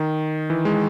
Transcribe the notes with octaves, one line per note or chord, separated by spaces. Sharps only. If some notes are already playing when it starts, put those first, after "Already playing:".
Already playing: D#3
E3
G#3